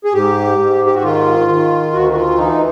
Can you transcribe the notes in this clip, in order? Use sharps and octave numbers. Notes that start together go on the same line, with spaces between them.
G#4
G#2 G4
G#2
G4
F#4
D#3 F4
D#3
D2 F#4
F#4
F4
E3 D#4